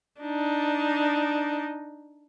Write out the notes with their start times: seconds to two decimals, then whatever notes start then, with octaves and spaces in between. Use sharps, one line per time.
0.22 D4 D#4